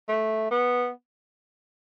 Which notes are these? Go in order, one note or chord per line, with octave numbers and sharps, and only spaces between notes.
A3
B3